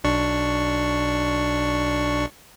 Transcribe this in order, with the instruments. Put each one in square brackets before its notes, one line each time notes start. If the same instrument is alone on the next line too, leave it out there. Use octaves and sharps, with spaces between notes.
[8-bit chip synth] B1 D4 C#6